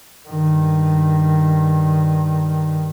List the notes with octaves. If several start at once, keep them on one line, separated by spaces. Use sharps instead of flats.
G2 D#3